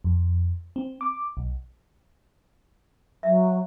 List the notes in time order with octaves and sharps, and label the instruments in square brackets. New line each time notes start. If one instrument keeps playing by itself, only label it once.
[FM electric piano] F2
C4
D6
B1
[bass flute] F#3 [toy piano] E5